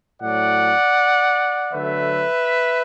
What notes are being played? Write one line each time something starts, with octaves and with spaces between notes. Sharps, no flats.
A2 F#3 A3 D5 F#5
D3 F#3 A3 B4 E5